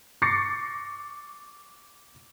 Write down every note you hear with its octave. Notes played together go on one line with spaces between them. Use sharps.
C#6 D6 A6 A#6 C7 C#7